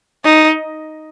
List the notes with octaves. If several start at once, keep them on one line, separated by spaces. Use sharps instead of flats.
D#4